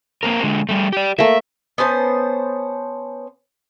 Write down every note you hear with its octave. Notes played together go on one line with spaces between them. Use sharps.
A#3 C4 A#4
D3 G#3
G3 A3
G4 D5
A3 A#3 E5
B3 C#4 C5 A5